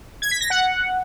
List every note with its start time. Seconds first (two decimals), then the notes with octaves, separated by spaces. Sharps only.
0.22 G#6
0.31 B6
0.41 A#6
0.50 F#5